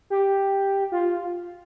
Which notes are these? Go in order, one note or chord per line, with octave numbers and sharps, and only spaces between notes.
G4
F4